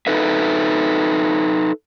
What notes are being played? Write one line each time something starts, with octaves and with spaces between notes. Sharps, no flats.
D#4 A4 B4 E5